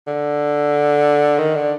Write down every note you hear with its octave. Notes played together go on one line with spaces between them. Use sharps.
D3
D#3
D3